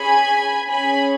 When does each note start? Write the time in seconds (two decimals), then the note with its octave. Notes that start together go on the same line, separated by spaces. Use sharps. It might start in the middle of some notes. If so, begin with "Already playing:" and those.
Already playing: C#4 G#4 G#5 B5
0.69 C#4 G#4 G#5 B5